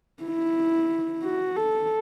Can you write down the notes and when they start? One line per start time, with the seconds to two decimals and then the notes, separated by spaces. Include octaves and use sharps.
0.24 E4
1.23 F#4
1.57 A4